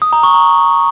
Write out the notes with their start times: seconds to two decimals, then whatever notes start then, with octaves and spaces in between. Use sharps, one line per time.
0.02 D#6
0.13 A#5
0.23 C#6
0.34 A#5